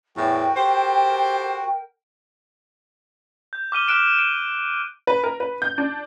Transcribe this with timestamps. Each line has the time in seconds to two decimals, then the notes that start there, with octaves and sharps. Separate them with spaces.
0.16 E2 A2 F#4 A#4 G5
0.55 G4 A4 C5
3.53 G6
3.72 D6 F6 D#7 G7
3.88 D6 F6 F#6 D7 E7
4.19 D7
5.07 B4
5.24 A#4
5.40 B4
5.62 G6
5.78 D4